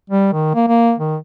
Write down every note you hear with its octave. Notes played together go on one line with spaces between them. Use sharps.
G3
D#3
A#3
A#3
D#3